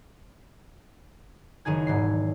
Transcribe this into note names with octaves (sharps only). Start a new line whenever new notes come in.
F#1 D#3 D#4 G#4 G#6
E1 G#2 C7